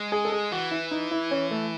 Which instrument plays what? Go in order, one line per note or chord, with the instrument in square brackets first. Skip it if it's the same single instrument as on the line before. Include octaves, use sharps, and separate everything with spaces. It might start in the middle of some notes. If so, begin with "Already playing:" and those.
Already playing: [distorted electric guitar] G#3
[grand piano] G#4
A4
G#4
[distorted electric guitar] E3 [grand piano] F#4
[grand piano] E4
D#4
E4
C#4
A3